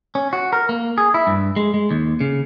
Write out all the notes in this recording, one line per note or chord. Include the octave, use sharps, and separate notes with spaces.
C#4
F#4
A#4
A#3
G#4
E4
G2
G#3
G#3
D#2
C#3